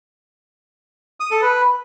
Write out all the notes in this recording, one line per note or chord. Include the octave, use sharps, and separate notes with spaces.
D#6
A4
B4